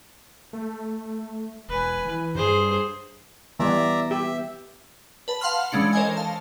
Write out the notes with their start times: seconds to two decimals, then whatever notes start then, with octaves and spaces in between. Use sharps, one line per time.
0.53 A3
1.69 E1 B4 G#5
2.05 E3
2.35 G2 G#4 C5
3.60 E3 G3 B3 D5 E5 A#5
4.11 G4 E5
5.28 B4 A5 F#7
5.41 F5 F#5 A5 C6 F6 F#7
5.71 E3 G#3 C#4 D4 C#7 F#7
5.93 A4 A#4 C5 C#5 D#5 G#5
6.17 F5 A5